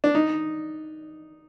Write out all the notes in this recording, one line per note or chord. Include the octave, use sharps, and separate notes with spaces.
D4
D#4